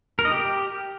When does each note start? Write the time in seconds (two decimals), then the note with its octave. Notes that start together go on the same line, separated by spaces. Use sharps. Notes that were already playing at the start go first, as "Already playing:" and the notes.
0.19 A#4
0.25 D#5
0.31 G4